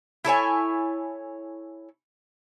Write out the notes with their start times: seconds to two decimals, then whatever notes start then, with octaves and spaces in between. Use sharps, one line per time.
0.25 E4 A4 C#5 G#5